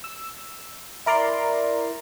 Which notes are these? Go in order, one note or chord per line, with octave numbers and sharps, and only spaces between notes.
E6
E4 A#4 D5 A#5 C6